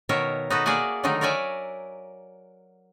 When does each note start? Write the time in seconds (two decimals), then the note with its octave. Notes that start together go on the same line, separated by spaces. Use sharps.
0.09 B2 D#3 A#4 C#5 E5
0.50 D#4 F#4 A4 B4
0.66 A#3 G#4 D5 E5 F#5 G#5
1.03 D3 D#3 F#3 A3 D#4
1.21 A#4 C#5 D5 E5 G#5